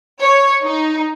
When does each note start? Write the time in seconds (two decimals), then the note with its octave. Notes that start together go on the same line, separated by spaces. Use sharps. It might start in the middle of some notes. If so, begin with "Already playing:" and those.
0.21 C#5
0.63 D#4